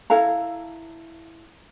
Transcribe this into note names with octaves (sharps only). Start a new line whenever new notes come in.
E4 A4 F5 A#5